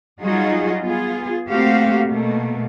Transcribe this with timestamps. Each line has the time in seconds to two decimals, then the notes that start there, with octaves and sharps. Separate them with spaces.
0.21 F#3 G3 D#4 F4 F#4 G#4
0.82 B3 F4 G#4
1.49 A3 A#3 C4 F#4 G4 F5
2.07 B2 A3 A#3